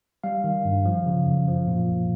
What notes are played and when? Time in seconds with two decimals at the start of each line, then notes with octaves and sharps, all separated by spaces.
0.24 G3 F5
0.44 D#3
0.65 G2
0.85 F3
1.06 C#3
1.26 F#2
1.48 F3
1.67 A#2
1.88 C2